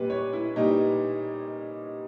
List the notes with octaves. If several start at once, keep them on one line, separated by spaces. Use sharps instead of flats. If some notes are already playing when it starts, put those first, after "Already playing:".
Already playing: A#2 G3 B4
C#5
E4
A#2 G3 D#4